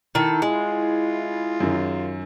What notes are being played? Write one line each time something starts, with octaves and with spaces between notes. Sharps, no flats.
D#3 E4 A4
G#3 F4 G#4
F#2 D#3 F#3